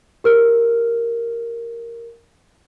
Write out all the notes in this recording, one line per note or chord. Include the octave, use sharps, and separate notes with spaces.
G4 A#4 F6